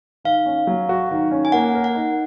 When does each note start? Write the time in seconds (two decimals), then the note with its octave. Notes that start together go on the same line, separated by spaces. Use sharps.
0.24 D#3 F5
0.46 C#4
0.67 F#3
0.89 F#4
1.11 D#3
1.31 C#4
1.45 G#5
1.52 A#3 F#5
1.75 A#4
1.84 F#5
1.95 D#4